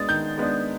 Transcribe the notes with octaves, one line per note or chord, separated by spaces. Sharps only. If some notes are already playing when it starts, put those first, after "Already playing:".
Already playing: G#3 B3 D4 D#6 A6
D#3 G6
G#3 B3 D4